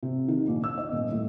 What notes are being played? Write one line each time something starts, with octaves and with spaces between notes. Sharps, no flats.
C3
D#3
A#1
E6
D#5
D#1
A2